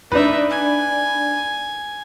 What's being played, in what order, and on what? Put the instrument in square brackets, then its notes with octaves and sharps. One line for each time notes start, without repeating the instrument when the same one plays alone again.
[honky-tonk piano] D4 B4 [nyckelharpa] D#4 E5
[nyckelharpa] G#5